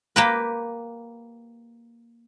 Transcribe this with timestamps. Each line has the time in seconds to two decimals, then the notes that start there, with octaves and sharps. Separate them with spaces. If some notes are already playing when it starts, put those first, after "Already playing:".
0.16 A#3 G4 B4